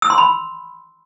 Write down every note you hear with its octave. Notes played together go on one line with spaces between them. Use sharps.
E6
C6
B5